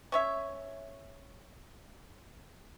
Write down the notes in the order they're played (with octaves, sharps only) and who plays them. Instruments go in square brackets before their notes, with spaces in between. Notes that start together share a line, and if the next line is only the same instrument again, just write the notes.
[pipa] C#4 C#5 E5